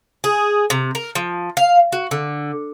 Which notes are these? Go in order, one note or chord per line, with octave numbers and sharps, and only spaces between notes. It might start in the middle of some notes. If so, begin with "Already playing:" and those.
G#4
C3
A#4
F3
F5
F#4
D3